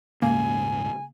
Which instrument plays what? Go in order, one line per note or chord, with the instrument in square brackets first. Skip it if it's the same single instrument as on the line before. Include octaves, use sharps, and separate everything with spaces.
[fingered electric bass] D#1 G#2 C#3 [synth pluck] A#3 [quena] G#5